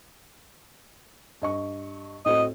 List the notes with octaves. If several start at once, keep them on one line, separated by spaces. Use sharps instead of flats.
G2 D#5 C#6
A2 C4 F#4 D#5